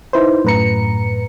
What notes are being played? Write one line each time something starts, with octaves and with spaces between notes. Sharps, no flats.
D#4 E4 B4 C5
F#2 A2 B4 A#5 C#7